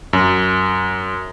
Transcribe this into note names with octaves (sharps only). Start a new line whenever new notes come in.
F#2